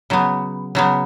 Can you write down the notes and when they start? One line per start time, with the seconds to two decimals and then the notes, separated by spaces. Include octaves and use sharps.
0.10 C#3 F#3 B3
0.75 C#3 F#3 B3